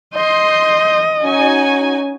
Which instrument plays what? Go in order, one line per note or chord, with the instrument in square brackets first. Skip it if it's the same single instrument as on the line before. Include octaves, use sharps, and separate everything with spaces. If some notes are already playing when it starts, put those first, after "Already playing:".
[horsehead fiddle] D#5 [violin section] C6 G6
[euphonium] C#4 [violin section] D#4 F#4 G#5